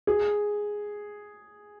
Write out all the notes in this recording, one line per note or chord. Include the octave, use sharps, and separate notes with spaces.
G#4